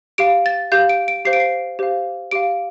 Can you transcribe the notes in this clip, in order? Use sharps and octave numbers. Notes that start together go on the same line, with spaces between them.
G4 F5 D7
A6
G4 F5 G6
D7
D7
G4 C5 F5 C7
D7
C7
G4 C5 F5
G4 F5 D7